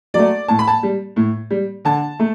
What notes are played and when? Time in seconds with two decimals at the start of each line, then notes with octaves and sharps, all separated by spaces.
0.14 F#3 A3 D5
0.48 A2 A5
0.59 B5
0.68 A5
0.83 G3
1.16 A2
1.51 G3
1.85 D3 A5
2.19 A3